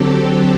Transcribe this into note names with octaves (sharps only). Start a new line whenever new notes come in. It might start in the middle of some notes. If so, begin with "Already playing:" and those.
Already playing: D3 F#3 C4 G4 A4